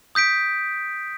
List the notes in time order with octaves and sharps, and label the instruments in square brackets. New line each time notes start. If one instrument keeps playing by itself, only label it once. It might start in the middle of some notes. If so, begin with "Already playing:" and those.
[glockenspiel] D#6 G6 B6 D7